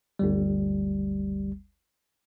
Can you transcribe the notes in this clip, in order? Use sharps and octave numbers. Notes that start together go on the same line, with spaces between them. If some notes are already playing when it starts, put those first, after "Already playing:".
G1 D2 G3